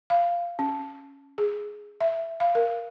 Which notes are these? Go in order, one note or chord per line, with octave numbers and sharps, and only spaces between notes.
F5
C#4
G#4
E5
F5
A#4